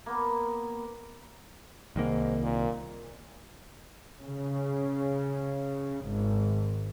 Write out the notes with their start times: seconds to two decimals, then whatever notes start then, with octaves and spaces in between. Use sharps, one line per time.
0.06 A#3 B3
1.96 C2 G#2 D#3 A#3
2.43 A#2
4.23 C#3
6.06 G#1